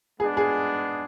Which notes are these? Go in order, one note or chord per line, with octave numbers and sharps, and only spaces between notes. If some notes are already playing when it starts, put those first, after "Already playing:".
G#3 B3 D4 G#4
G#4